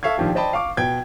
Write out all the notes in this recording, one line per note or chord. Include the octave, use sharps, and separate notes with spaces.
A4 E5 F5 C#6 G#6
A#1 D#3 F3 G4
C5 D5 D#5 G5 A5 B5
F5 C#6 D6
B2 G5 G#6